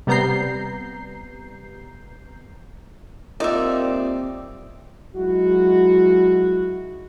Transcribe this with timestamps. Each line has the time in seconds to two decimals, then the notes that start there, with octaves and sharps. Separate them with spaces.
0.07 C3 G3 B3 A#5 G6 C7
3.40 A#2 G3 C4 D#4 D5 E5
5.15 F#3 G#3 D#4 E4 F#4